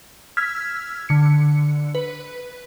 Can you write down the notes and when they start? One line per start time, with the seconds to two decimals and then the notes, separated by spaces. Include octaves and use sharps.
0.37 E6 F6 G#6 B6
1.09 D3 C#7
1.95 B4